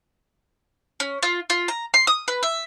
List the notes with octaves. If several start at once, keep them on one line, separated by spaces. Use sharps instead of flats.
C#4
F4
F4
A#5
C6
D#6
B4
E5